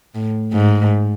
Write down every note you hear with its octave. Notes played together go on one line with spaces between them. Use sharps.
A2
G#2